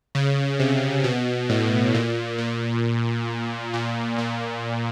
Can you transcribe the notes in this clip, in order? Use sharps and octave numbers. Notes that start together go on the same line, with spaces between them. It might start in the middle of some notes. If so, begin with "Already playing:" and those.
C#3
C3
B2
A2
A#2
A#2
A#2
A#2